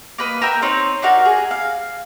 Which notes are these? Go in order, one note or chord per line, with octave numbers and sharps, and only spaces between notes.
A#3 B4 D#5
A#4 E5 G5
C4 D#4 C#5
D4 D#4 F#4 A#4
G#4
F5